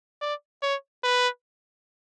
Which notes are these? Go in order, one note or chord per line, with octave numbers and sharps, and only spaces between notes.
D5
C#5
B4